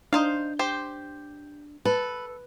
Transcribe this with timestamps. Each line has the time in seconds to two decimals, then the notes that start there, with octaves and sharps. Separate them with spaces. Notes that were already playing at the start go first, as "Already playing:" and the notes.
0.13 D4 D#4 C5 F5
0.59 G4 C5
1.85 A4 B4